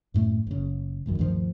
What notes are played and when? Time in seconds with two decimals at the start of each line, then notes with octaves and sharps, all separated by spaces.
0.14 F#2 A2 A3
0.47 F#1 C#3
1.06 G1 C#2 F#2 D#3
1.19 D2 G2 D#3 F3